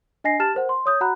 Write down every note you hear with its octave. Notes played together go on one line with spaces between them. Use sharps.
D4 D#5 G#5 A#6 C7
G4 A5 F6 A6 E7
A#4 C5 F#5
C6
C#5 D#6 G6
F#4 F#5 A#5 B5 F#6